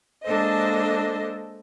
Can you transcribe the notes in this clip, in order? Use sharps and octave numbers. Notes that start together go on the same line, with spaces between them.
G#3 A#3 D4 A4 C5 D#5